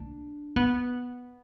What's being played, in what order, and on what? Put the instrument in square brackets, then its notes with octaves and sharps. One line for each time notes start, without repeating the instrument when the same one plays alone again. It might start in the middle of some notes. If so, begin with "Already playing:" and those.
Already playing: [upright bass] D4
B3